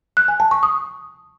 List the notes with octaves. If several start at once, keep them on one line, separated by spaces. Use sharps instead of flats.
F#6
G#5
A5
C#6
D#6